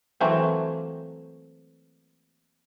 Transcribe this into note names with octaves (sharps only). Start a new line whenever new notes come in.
E3 F#3 A3 A#3 C4